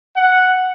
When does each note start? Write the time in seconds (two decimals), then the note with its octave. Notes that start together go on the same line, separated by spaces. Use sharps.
0.15 F#5